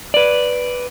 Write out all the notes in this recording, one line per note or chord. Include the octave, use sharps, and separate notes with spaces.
B4 D5